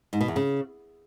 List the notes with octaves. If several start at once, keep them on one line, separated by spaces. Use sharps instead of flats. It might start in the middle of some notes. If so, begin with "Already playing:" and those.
G#2
B2
E2
C#3